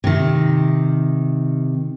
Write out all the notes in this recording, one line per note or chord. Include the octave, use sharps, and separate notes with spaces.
C3 D#3